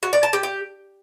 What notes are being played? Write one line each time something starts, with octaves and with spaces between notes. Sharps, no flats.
F#4
D5
A5
G4
G4